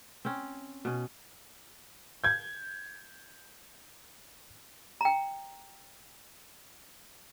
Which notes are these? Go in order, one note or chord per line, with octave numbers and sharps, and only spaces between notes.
C4 C#4
B2 C#4
G6 G#6
G5 A#5